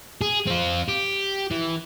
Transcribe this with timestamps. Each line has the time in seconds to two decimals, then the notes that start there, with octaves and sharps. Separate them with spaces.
0.21 G#4
0.47 C4 F4
0.89 G4
1.51 E3